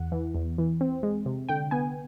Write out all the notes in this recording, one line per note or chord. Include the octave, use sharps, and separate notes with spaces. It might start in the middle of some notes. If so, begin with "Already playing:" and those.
Already playing: E2 F#5
E3
E2
E3
C4
G#3
C3
D3 G5
B3 G#5